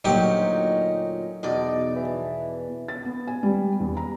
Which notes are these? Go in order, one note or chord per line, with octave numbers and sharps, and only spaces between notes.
D2 A#2 F#3 C#4 D#4 G4 G5
E2 B2 D#4 D5
E3
A6
B3
G#5
G3
E2
A#5